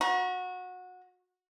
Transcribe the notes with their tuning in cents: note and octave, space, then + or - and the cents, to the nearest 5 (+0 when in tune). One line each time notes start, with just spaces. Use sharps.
F#4 -20 A#5 +40